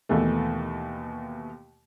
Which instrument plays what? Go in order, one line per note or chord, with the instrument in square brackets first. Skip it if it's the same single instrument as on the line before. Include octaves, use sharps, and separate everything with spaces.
[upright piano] D#2 B2 E3 A3